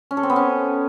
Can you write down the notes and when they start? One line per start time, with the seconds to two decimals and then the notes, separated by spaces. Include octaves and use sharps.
0.11 C#4
0.17 A4
0.23 C4
0.30 B3
0.36 C#4